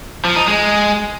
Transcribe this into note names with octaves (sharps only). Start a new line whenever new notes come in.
F3
D#4
G#3